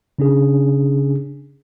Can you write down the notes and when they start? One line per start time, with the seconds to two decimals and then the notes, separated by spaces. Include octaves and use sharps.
0.19 C#3 C#4 D4 G#4